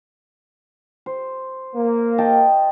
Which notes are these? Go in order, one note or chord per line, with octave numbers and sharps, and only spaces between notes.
C5
A#3
D#5 G5 A5